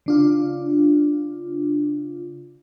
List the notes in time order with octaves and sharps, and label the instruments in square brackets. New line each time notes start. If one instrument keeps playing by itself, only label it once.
[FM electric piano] C#3 D4 F4